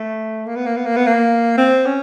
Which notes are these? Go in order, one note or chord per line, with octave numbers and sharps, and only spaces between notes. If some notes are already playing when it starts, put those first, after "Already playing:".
Already playing: A3
A#3
B3
A#3
B3
A#3
B3
A#3
C4
C#4